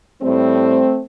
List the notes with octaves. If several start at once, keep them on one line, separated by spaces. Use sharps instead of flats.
A2 G3 A3 C4